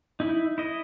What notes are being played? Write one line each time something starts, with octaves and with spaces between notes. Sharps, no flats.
D#4 E4
E4 D#5